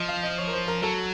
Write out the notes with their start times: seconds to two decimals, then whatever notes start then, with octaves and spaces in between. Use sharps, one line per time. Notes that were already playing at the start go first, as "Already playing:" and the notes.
Already playing: F3 D#5
0.09 F5
0.23 D#5
0.38 C#5
0.48 A#4
0.53 C5
0.68 A#4
0.82 F#3 A4